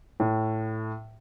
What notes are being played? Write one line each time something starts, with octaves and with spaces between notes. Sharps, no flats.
A2